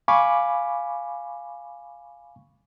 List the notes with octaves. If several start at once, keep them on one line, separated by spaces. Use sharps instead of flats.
F5 G#5 B5 C#6 D6